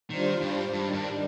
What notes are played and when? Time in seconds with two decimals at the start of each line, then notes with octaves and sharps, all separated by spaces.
0.10 D#3 G3 D4 F4 C5
0.41 G2
0.73 G2 D#3 G3 D4
0.94 G2